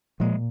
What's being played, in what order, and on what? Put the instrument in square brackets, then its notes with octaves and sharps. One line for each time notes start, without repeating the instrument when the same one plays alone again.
[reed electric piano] A#2 [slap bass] F3 G#3